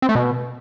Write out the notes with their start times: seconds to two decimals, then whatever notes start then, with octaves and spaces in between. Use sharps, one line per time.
0.02 C4
0.09 A3
0.15 B2